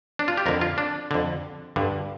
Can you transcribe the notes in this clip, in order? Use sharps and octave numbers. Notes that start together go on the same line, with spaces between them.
D4
F4
G4
F2 D3 A#4
F4
D4
F2 D3
G2 D3